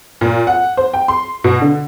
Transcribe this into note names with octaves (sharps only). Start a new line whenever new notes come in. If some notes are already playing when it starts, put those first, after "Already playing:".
A#2
F#5
C5
G5
C6
B2
D3